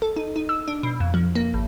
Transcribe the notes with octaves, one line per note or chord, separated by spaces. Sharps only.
A4
D#4
D#4
E6
D4
B2
F2
F3
A#3
G#1